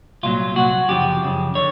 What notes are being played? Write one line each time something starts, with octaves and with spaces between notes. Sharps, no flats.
C2 A#2 F#3 F4
C2 A#2 F#3 F#4
F#2 C#3 F3 G4
F#2 C#3 F3
D3 C#5